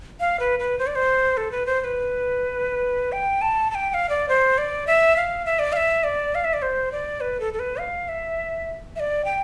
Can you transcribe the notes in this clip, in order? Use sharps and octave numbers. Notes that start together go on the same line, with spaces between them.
F5
B4
B4
C5
D5
C5
A4
B4
C5
C5
B4
G5
A5
A5
G5
G5
F5
D5
C5
D5
E5
F5
E5
D5
F5
E5
D5
F5
E5
D5
C5
D5
B4
A4
A4
B4
F5
E5
E5
D5
G5